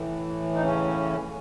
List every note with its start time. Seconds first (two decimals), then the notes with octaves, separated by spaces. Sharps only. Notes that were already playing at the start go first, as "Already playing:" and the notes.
Already playing: A2 E3
0.54 D#4
0.62 C#3 C#4